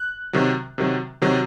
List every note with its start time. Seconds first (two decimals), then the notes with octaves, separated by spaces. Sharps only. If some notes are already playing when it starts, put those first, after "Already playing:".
Already playing: F#6
0.33 C3 D#3 F#3
0.78 C3 D#3 F#3
1.22 C3 D#3 F#3